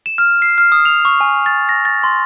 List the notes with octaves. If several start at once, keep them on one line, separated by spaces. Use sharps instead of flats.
E7
F6
C7
F6
D#6
F7
C#6
G#5
A6
A#6
A6
C6